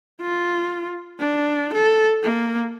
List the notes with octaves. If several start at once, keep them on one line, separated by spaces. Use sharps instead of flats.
F4
D4
A4
A#3